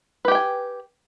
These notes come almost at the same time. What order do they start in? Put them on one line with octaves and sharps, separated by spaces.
B4 G4 G5 G#5